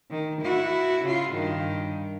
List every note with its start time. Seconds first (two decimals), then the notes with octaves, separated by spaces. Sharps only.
0.10 D#3
0.42 E4 F#4
1.05 C#3 F4
1.34 G2 D#3